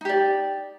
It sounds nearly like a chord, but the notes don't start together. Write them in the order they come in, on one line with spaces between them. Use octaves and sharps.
D#4 G4 D5